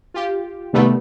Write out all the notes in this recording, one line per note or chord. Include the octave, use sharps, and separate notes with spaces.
F4 G4
C3 D#3 G3 A3 B3